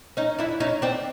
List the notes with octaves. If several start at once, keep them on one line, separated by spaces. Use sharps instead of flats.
C#4 D#4
D4 E4
C#4 D#4
C4 D4